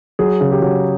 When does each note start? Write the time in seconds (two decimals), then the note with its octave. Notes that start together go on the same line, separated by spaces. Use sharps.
0.19 F#3 G#4
0.41 C#3
0.52 G4
0.62 F#3